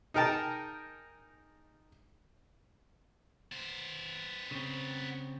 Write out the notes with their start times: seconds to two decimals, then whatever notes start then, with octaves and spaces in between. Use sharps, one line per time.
0.14 D#4 G#4 A#4 G5 A5
3.52 B3 C5
4.51 C#3 C4